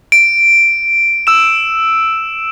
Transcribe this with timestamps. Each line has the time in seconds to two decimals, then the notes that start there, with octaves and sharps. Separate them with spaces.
0.12 D7
1.27 E6 E7